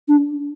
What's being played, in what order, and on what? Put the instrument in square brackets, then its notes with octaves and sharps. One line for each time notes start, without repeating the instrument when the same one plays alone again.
[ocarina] D4